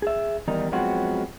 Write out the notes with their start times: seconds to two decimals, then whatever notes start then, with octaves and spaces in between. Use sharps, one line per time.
0.02 G#4 E5
0.48 E2 D#3 G3 D#4
0.72 F3 F#3 G#3 B3 C4 F#4